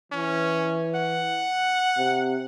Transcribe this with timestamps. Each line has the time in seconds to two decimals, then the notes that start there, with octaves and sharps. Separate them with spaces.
0.12 E3 C#4
0.95 F#5
1.98 C3